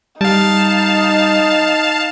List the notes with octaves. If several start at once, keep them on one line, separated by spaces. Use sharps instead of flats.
G3 D#4 F5 A5